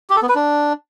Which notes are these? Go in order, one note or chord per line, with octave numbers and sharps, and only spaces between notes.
G4
A4
B3
B4
D4